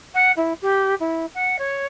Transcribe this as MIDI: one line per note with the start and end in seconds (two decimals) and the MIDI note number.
0.14 0.32 78
0.36 0.53 64
0.62 0.95 67
1.00 1.26 64
1.34 1.56 78
1.59 1.86 73